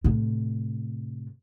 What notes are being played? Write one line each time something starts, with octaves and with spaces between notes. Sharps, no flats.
A2 C3